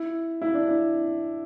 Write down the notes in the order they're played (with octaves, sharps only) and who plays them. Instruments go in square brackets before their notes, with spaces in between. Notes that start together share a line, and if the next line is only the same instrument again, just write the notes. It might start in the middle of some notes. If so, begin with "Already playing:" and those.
Already playing: [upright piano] E4
E4
D4
E4